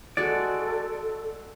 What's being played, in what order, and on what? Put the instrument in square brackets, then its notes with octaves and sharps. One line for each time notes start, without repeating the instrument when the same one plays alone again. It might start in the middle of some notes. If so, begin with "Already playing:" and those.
[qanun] G#3 F#4 [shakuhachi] A4 [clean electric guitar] D5